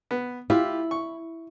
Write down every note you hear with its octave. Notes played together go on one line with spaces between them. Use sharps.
B3
E4 F4 G4 F5
C#6